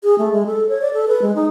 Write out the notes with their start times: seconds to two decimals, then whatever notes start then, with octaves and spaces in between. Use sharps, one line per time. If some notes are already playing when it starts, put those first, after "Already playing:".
0.04 G#4
0.18 A3
0.32 G#3
0.46 A4
0.69 C#5
0.81 D5
0.94 A4
1.08 B4
1.22 G#3
1.35 D#4